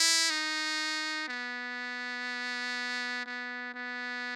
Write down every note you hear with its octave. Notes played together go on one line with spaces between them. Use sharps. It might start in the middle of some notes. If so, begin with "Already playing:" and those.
Already playing: E4
D#4
B3
B3
B3